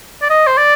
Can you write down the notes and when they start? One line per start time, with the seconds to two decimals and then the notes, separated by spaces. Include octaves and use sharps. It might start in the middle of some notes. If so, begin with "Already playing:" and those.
0.22 D5
0.30 D#5
0.47 C5
0.57 D5